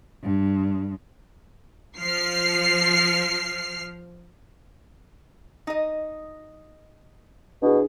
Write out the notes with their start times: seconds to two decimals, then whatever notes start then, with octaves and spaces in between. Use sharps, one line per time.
0.22 G2
1.98 F3 F6 C7
5.67 D#4 D#5
7.62 B2 D4 E4 G#4